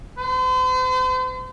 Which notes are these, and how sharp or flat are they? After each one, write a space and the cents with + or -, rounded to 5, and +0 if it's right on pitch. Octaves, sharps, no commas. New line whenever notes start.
C5 -45